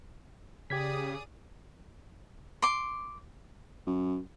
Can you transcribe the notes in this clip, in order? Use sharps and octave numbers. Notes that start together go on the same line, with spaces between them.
C#3 G4 G#4 D5 D#6 G#6 B6
C6 D6
F#2